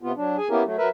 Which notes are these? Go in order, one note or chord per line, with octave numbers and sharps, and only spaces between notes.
C3 B3 F4
F#3 D4
G#4 G#5
A#3 B3 C#4 E4 G4 A#4
F#3 A3
F#3 A#4 B4 E5